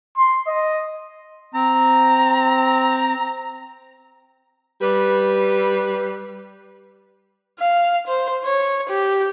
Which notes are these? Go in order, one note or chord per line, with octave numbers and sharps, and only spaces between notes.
C6
D#5
C4 A#5
G3 B4
F5
C5
C#5
G4